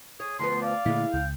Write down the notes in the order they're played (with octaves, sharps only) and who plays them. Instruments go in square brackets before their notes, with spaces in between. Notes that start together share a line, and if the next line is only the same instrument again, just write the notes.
[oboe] G#4 [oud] C#5
[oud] D2 F3 B3 [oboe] C6
[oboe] D5 [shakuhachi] F5
[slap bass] A#2 D3 A3 [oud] G#3 E4
[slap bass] C#2 [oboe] G5